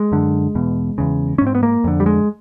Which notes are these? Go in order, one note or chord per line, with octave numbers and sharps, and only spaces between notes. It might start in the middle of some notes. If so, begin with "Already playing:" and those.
Already playing: G#3
F#2 D3
E2 B2
E2 C#3
C#4
G#2
C4
B3
A#3
F2 D3
G3
G#3